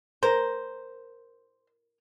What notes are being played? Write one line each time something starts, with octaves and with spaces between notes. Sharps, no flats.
A#4 C5